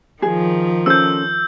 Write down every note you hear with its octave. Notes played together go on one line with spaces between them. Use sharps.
D#3 F3 G#4
C#4 A4 C5 E6 G6